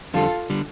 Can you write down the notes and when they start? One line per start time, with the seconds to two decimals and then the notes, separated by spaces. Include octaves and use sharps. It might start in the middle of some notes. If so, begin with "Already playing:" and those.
0.14 F2 D3 G3 F4 A4
0.50 D3 G3